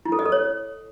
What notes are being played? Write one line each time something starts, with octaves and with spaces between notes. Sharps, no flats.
E4
A4
D#5
A4
C#5